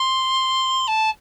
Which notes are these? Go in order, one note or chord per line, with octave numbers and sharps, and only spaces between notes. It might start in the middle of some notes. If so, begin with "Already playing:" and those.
Already playing: C6
A5